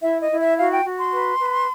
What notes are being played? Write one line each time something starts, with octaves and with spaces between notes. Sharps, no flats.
E4 E5
D#5
E4
E5
F#4 F5
G5
F#4
C6
B4
B4